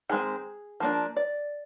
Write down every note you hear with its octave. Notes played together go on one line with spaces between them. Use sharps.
D#3 G#3 C4 G#4
F3 A#3 D4
D5